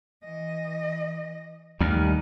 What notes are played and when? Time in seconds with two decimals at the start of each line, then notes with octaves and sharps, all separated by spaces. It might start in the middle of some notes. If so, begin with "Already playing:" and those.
0.23 E3 D#5
1.81 D#2 A2 G3 A3 D#4 F6